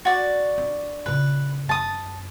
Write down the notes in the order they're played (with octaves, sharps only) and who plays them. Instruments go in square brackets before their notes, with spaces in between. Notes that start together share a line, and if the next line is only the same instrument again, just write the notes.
[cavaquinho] F#4 D5
[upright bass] D4
[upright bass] A#2 C#3 [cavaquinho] B4
[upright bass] F#2 [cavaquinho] A5 D#6